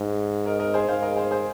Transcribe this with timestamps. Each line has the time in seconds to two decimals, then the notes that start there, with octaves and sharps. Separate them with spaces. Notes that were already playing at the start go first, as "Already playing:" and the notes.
Already playing: G#2
0.46 A#4 D#5
0.59 A#4 D#5
0.74 G#4 C5
0.88 G#2 C5 F5
1.02 A#4 D#5
1.16 G#4 C5
1.31 G#4 C5